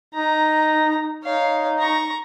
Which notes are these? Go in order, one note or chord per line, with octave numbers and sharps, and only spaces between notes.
D#4 A#5
D#4 C#5 F5
A#5 C#6